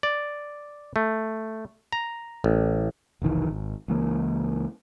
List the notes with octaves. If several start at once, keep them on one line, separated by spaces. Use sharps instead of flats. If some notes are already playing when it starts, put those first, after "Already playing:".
D5
A3
A#5
A1
F1 B1 D#3 E3
G#1
C#2 E3 A#3